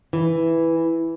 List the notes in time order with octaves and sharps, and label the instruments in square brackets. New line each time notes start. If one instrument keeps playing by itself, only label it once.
[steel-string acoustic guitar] E3